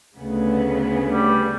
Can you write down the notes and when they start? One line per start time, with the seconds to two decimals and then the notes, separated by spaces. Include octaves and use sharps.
0.16 D2 C#3 B3
1.09 G3